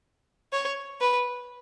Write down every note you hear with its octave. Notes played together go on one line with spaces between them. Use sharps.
C#5
B4